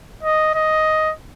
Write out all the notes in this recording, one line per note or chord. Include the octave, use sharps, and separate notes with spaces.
D#5
D#5